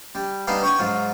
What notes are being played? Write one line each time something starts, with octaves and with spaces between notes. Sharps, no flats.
G3
G3 B3 D4 D#4 G4 F5
C#5 G5 G#5 C#6
G#2 F#3 F4